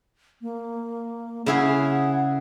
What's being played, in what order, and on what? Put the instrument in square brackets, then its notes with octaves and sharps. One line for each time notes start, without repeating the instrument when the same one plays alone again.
[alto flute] A#3
[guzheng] C#3 E4 G#4 [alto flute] F#5